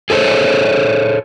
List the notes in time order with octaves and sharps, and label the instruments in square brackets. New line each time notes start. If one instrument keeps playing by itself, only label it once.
[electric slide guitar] G#4 A4 C5 C#5